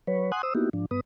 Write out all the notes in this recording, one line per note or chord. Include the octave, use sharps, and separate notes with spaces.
F#3 B4 C#5
F#5 G#5 C6 D#6 F#6
C5 D#6 E6
A#3 B3 D#4 E4 F#4 G4
G#2 F3 D4
G2 B3 B4 D#6